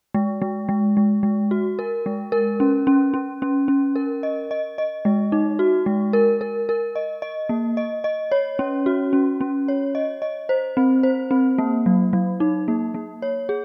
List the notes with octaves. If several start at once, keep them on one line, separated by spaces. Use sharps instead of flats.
G#3
G#3
G#3
G#3
G#3
F#4
A#4
G#3
A#4
C#4
C#4
C#4
C#4
C#4
A#4
D#5
D#5
D#5
G#3
D#4
F#4
G#3
A#4
A#4
A#4
D#5
D#5
A#3
D#5
D#5
C#5
C#4
F#4
C#4
C#4
C#5
D#5
D#5
C5
C4
C5
C4
A#3
F#3
F#3
D#4
A#3
A#3
C#5
G#4